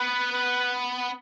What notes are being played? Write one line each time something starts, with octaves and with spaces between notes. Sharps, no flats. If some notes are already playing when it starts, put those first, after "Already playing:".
Already playing: B3 B4
B4